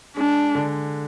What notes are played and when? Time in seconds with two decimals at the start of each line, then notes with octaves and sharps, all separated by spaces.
0.16 G#3 D4
0.55 D3